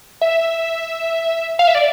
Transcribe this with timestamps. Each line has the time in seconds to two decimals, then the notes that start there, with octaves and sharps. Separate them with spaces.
0.21 E5
1.59 F5
1.67 E5
1.75 D5